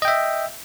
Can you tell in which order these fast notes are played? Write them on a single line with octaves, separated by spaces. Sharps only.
D#5 G5 E5